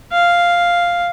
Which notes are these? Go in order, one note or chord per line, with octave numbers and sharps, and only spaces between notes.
F5